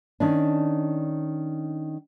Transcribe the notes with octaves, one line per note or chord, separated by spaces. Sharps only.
D#3 C#4 D4